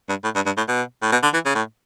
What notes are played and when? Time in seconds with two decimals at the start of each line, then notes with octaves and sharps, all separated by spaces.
0.09 G2
0.24 A2
0.35 G2
0.46 G2
0.57 A2
0.68 B2
1.02 A2
1.12 B2
1.23 D3
1.33 E3
1.45 C#3
1.55 A2